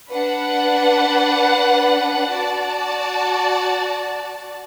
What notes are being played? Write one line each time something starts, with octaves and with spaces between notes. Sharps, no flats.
D4 B4 F#5
F#4 D5 A5